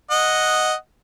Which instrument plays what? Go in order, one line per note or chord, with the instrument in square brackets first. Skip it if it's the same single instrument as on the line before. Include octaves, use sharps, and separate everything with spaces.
[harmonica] D#5 F#5